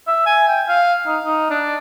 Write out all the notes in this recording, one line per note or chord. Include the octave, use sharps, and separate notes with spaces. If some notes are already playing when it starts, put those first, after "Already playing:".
E5
G#5
G5
F5
D#4
D#4
D4